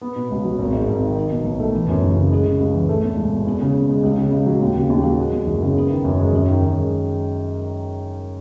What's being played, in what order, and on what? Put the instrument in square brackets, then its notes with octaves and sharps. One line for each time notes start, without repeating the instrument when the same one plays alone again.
[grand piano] B3
B2
C#2
F#3
G#1
G#2
G#1
D#3
D#4
B2
B1
A3
E3
F#2
F#1
C#3
G#3
C#3
C#2
E3
A3
E2
E1
B2
E2
C#3
E2
G#3
C#2
C#3
C#2
F#3
D#2
C#3
D#2
F#3
G#3
E2
F#1
C#3
B3
D#3
F#2
G#3
F#2
D#3
F#2
G#3